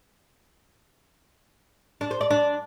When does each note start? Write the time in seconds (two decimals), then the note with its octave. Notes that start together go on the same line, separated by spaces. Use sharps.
2.01 D4
2.11 C5
2.21 D5
2.31 D4